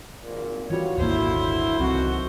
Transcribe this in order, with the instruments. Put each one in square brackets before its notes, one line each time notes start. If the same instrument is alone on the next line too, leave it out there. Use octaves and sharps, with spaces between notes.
[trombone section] G#1 A#2
[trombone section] F#2 G3 B3 [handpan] E3 F4 F#4 [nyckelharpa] C#5
[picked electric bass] D#1 G#1 A#3 [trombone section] D3 F#3 E4 [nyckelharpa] C5
[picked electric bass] C2 C4 [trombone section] D#3 A3 F#4 [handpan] F#3